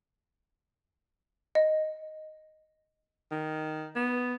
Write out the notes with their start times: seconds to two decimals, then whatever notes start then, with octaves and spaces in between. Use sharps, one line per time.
1.55 D#5
3.31 D#3
3.96 B3